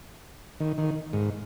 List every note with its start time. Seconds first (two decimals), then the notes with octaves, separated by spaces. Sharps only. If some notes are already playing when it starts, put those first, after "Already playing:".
0.60 D#3
0.78 D#3
1.13 G#2